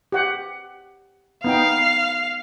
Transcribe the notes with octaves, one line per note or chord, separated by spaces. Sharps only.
G4 F#5
B3 D#4 F5 G5